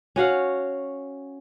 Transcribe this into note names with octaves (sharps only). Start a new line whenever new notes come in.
C#4 F#4 F5 F#5